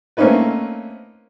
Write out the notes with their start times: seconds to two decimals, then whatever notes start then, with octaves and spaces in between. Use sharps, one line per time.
0.17 A3 A#3 C4 C#4 D#4 B4